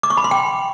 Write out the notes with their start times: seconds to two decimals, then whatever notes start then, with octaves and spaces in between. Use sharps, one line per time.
0.03 D6
0.10 C#6
0.17 B5
0.24 C6
0.31 G5